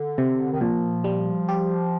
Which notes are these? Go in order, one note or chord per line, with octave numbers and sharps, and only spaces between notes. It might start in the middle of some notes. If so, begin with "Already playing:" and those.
Already playing: D3
C3
D#3
A#2 F3
G3
G4